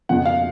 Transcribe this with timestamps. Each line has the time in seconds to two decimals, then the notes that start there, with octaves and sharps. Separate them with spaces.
0.09 F2 C#3 F3 F#5
0.25 F5